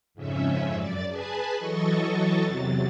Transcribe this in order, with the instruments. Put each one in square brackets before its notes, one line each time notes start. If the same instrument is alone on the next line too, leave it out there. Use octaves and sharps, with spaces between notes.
[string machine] F2 G#2 C#3 C#4 E5
F#2 D5 A6
G#4 B4 G#5 A5 B5
E3 F#3 A4 D#5 C#6 A6
E2 C3 F#3 A6